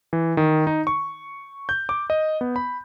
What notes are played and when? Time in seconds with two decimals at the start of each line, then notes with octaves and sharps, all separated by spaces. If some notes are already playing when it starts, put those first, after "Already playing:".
0.13 E3
0.37 D#3
0.67 D#4
0.87 C#6
1.69 G6
1.89 D6
2.10 D#5
2.41 B3
2.56 B5